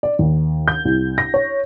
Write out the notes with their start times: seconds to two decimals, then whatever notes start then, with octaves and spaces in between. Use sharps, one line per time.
0.03 D5
0.19 D#2
0.68 G6
0.85 C2
1.18 A#6
1.34 C#5